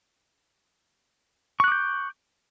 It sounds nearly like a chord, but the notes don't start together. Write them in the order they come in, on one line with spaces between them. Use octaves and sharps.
C#6 F#6 D6 G6